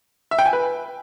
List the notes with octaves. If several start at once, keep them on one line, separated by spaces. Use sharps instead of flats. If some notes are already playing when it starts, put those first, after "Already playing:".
E5
G5
G#5
B4